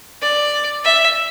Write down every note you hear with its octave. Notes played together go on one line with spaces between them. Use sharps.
D5
E5